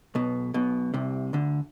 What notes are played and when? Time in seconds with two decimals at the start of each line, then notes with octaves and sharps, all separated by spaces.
0.15 B1 B2
0.54 B1 B2
0.94 C2 C3
1.33 D2 D3